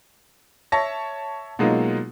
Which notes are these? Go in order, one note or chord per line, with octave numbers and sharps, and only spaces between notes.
C#5 E5 A5 A#6
B2 F#3 G#3 A#3 D#4 F4